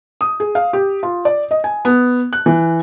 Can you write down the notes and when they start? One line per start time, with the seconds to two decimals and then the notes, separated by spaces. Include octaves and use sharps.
0.21 D#6
0.40 G#4
0.55 F5
0.73 G4
1.03 F4
1.25 D5
1.51 D#5
1.64 G#5
1.85 B3
2.33 F#6
2.46 E3